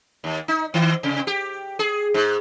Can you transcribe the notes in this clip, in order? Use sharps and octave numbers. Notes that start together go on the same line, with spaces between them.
D#2
D#4
D#3
C3
G4
G#4
G#2